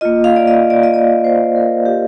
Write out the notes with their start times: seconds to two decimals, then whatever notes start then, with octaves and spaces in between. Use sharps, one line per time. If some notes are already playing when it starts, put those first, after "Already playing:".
0.01 A#3 F4 D#5
0.24 F5
0.36 D5
0.47 D#5
0.70 D5
0.83 D#5
0.94 D5
1.24 C5
1.56 A#4
1.86 G4